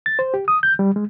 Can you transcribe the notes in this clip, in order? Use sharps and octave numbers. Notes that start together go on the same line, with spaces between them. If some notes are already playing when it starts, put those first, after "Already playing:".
A6
C5
G4
D#6
G6
G3
G#3